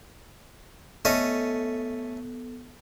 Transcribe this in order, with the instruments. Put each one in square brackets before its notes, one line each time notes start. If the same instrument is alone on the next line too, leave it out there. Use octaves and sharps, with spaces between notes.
[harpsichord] A3 C#4 D#5 [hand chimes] B3 A4